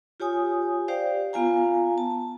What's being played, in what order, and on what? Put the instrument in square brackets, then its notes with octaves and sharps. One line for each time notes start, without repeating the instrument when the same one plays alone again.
[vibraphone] F4 G4 C#5 G#5 D#6
G4 C5 D5 F5 G5
B3 F4 F5 G#5 A#5
A5